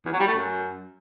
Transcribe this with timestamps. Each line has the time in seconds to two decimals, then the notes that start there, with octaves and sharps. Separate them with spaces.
0.05 E2
0.12 F#3
0.20 G3
0.27 A3
0.34 F#2